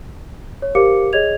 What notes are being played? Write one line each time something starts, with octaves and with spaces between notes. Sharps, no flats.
C#5
G4 A#4 C5 F5 D6 C#7
G#4 C#5 D#5 G#6 F7